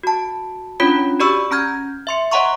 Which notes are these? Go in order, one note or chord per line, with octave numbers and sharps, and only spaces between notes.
F#4 A5
C#4 D4 F4 C#5 B5
F#4 G4 D5 B5 C#6 E6
C#4 A#5 F6 G6 G#6
E5 C6 C#7
C#5 D#5 F#5 A#5 C6 C#6